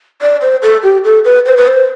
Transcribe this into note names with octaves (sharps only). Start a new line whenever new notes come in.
D5
C5
A4
G4
A4
B4
C5
B4
C5